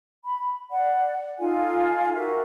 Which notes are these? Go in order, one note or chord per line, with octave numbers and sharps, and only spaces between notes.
B5
D5 F#5
D#4 F4 A4 G#5
F#4 G4 A#4 E5